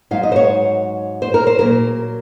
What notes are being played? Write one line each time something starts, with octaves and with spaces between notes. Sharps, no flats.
G#2 F#3 F5
D#5
C5
C#5
C5
A#4
C5
A#2 F#3 A#4